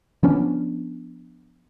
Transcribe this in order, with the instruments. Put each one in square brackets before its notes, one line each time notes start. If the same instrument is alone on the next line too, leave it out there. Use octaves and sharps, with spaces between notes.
[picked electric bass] F3 B3 C#4 D4